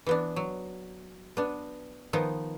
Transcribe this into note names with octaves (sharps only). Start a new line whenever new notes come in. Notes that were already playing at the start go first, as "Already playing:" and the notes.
E3 B3 D4
F#3
B3 D4
D#3 F3 B3 D#4